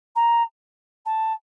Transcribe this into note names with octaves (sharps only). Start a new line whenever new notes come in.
A#5
A5